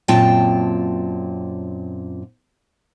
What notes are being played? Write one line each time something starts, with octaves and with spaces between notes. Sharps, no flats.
F#2 A#2 C4 F4 G5 A5